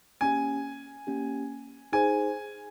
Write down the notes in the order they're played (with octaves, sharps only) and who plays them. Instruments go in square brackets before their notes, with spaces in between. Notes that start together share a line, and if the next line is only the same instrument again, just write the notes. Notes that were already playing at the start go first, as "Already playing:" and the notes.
[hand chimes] A#3 C#4 G4 [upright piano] G#5
[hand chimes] A#3 C#4 G4
[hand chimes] D#4 G#4 C5 [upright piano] G#5